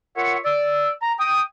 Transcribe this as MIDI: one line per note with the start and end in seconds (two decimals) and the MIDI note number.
0.17 0.38 65
0.17 0.38 70
0.17 0.38 73
0.17 0.38 76
0.17 0.38 78
0.45 0.91 74
0.45 0.91 88
1.03 1.14 82
1.20 1.42 79
1.20 1.42 87